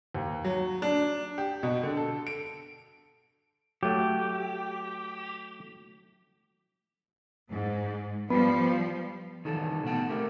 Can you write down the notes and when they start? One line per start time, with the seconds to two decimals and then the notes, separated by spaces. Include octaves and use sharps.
0.15 D#2
0.45 F#3
0.82 D4
1.38 G4
1.63 B2
1.83 D3
1.97 A4
2.27 D7
3.83 F#3 A3 G4
7.51 G#2
8.30 F3 G3 B3
9.45 D#3 E3 G3 A4
9.84 B2 A3 B3 F#5 G5 A5
10.09 A3 C4 G4 A#4